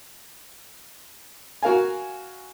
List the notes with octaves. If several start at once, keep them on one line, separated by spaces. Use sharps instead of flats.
F#4 A#4 F5 G#5